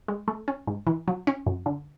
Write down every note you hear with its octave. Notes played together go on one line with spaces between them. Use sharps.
G#3
A3
C#4
G#2
E3
F#3
C#4
F#2
D3